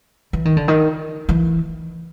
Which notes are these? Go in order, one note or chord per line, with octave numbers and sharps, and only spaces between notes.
E3
D#3
D3
D#3
E3